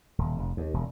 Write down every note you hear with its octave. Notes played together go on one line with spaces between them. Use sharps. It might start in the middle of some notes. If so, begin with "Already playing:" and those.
D#1
F1
D#2
E1